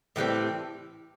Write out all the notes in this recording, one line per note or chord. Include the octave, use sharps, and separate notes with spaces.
A2 E3 G3 C4